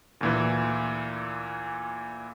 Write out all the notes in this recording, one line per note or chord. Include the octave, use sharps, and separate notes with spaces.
D2 A#2 E3